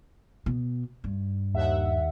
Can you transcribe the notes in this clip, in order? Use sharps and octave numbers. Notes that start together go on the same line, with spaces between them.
B2
G2
D#2 E5 F#5